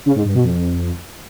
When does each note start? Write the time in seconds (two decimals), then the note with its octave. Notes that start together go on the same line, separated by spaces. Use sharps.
0.06 C#3
0.15 G#2
0.25 G2
0.34 B2
0.44 F2